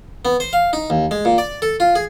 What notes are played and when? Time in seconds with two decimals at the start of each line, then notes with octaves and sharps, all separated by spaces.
0.25 B3
0.40 C5
0.53 F5
0.73 D#4
0.90 D#2
1.11 G#3
1.25 A#2
1.38 D5
1.62 A4
1.80 F4
1.95 G#4